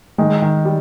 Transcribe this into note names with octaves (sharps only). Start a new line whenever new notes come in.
D#3 G#3
D#3
G3